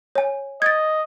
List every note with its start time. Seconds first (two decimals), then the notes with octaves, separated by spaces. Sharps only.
0.15 C#5 G#5
0.62 D#5 G#6 A6